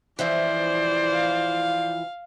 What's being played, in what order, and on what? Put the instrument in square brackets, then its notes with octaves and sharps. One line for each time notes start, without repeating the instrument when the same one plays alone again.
[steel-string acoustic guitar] E3 F3 E4 [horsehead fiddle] C5 D5
[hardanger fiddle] F5